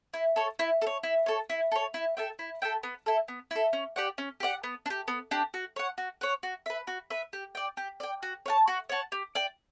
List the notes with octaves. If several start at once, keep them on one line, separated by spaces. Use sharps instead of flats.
E4
A4 C#5
E4
A4
C#5
E4
A4 C#5
E4
A4 C#5
E4
A4 E5 G5
E4
A4 E5 G5
B3
E4 A4
B3
E4 A4
C#4
G4 D5 F#5
C#4
G4 D5 F#5
B3
D4
G4
B3
D4 G4
F#4
C#5 F#5
F#4
C#5 F#5
F#4
B4 E5
F#4
B4 E5
G4
D5 G5
G4
D5 G5
F#4
C#5 F#5 A5
F#4
C#5 F#5 A5
G4
D5 G5